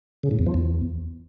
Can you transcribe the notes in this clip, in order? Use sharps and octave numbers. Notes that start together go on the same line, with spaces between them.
C#3
A2
E2
F3
E2